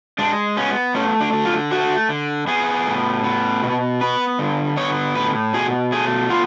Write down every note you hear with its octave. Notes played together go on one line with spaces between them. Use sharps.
G#3 D4
B3 C#4
A3 C#4
D4
D3
F4
A3 F#4
D3
B3 G#4
A2
B3
B2
B3 B4
D3
B3 C#5
A2 B4
B2 G#4
A3 G#4
B3 F4